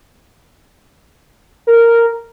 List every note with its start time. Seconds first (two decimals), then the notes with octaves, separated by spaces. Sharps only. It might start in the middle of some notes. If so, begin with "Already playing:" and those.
1.67 A#4